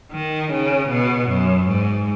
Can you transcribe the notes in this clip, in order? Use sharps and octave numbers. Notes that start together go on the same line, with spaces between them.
D#3
C#3
B2
F#2
G#2